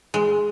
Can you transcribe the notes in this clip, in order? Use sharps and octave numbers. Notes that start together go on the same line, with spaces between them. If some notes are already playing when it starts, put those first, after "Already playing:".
G#3